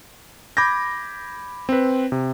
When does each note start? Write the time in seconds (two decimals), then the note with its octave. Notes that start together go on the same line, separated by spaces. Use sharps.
0.57 B5 D6 G6 G#6 A#6
1.69 C4 B4
2.12 C3